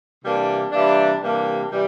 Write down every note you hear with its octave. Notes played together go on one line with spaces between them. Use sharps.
C3 E3 G3 A#3 D4
C3 E3 G3 A#3 D4
C3 E3 G3 A#3 D4
C3 E3 G3